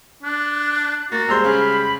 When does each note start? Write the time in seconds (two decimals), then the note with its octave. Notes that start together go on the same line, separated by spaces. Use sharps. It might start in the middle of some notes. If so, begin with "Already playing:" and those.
0.23 D4 F#6
1.12 A#3 F#4 A6
1.29 G3 G#3 C5 A#5 C6 E6
1.44 C#3 F5 B5